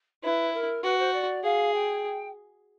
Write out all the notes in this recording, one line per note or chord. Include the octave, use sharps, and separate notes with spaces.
E4 B4
A#4
F#4 B4
C5
D5
G#4 F5
G5